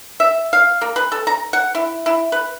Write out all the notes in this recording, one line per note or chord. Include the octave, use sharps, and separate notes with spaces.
E5
F5
A#3
B4
A4
A#5
F#5
E4
E4
B4